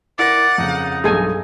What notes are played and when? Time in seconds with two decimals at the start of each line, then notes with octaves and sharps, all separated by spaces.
0.19 E4 A#4 D5 F#5 A#6
0.58 F2 C#3 D#4
1.04 B1 G2 G#4 A4 G#5